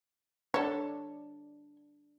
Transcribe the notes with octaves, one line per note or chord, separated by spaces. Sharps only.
D4 A4 C#5